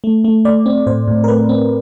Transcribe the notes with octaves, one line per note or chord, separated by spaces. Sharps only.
A3
A3
A3 D5
C4
A2 C5
A2
A#4
A3 B4
C4